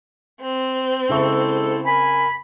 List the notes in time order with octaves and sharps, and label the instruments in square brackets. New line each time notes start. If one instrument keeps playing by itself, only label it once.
[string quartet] C4
[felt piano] C#3 E5 C#6 [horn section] G#3 E4 A4
[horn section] A#4 G#5 [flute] B5